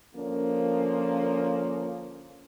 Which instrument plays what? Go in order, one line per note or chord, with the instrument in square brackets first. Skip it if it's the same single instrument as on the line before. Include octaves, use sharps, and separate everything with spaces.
[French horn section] D3 F3 A#3 C#4